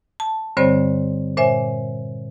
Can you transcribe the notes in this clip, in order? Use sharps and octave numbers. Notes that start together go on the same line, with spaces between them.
A5
G2 D3 G3 C4 C5 C#5
A#2 C5 C#5 E5 G#5